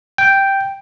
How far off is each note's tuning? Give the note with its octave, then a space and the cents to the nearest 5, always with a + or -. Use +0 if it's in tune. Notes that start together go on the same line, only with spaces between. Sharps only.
G5 +0